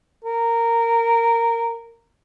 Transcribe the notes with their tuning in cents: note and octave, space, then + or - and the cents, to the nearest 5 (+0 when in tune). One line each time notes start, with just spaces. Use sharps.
A#4 -10